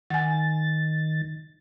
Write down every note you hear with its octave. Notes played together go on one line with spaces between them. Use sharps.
D#3 F#5 G#5 A6